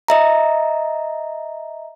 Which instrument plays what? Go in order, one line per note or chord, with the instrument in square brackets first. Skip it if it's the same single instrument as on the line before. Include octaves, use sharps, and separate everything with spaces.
[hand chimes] D#5 E5 A#5